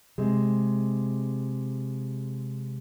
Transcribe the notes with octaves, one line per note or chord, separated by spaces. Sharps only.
C3 G#3